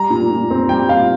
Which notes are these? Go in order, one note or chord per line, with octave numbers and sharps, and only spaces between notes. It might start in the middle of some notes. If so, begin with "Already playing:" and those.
Already playing: G3 A#5
A#2
A#2
C4
G3 G5
A#2 F5